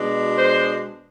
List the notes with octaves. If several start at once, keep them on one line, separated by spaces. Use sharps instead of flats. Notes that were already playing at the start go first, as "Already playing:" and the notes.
Already playing: B2 G#3 D4
C5